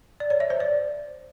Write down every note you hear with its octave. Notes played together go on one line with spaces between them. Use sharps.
D5
C#5
E5
C5
D5